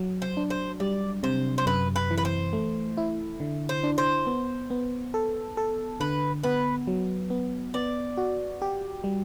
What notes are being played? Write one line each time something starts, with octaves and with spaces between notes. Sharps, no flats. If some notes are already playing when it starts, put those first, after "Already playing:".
Already playing: F#3
C5
D4
C5
G3 D5
C3 C5
C5
F#2 B4
B4
E3
B4
C5
A3
E4
D3
C5
D4
C5
B3
B3
A4
A4
D3 B4
B3 B4
F#3
B3
B3 D5
F#4
G4
G3